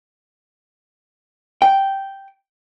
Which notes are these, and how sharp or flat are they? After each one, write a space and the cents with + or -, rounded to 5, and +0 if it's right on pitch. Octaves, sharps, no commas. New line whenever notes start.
G5 -5